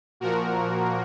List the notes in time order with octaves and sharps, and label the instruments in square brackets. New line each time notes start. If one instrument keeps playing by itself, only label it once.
[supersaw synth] A#2 F3 A#3 F#4 A#4